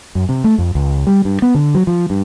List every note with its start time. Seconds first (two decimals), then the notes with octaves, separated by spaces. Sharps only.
0.15 F#2
0.29 C3
0.44 A3
0.58 F2
0.75 C#2
1.07 G3
1.25 G2
1.42 B3
1.55 D3
1.75 F#3
1.87 F3
2.10 G2